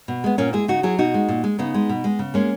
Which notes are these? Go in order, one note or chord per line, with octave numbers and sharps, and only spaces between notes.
B2
G#3 B3
A#2 A#3 C#4
G#3 E4 G#4
C#3 D#4 F#4
F#3 E4 G#4
B2 D#4 F#4
G#3
A#2
G#3
C#3 B3 D#4
G#3
B2
G#3
C#3
G#3 A#3 C#4